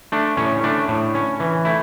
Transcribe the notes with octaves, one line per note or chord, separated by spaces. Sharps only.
A3 D4
A2 C#4
A3 D4
A2
C#4
E3
A3 E4